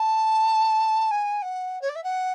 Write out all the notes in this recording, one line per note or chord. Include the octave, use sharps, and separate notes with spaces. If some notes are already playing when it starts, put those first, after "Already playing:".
Already playing: A5
G#5
F#5
C#5
D5
E5
F#5